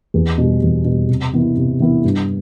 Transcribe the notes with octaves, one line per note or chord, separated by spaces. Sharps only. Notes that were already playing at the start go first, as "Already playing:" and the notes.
E2
B2 G3
E2
B2 G3
C3
E3 B3 E4
C3
E3 B3 E4
G2